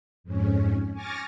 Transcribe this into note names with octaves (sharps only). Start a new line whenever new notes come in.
F2 G#2 C#4
G#5 C#6 D6 F6 A6 A#6